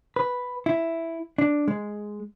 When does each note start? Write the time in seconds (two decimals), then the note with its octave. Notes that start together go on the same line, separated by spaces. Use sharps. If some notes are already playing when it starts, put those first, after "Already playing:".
0.16 B4
0.66 E4
1.38 D4
1.68 G#3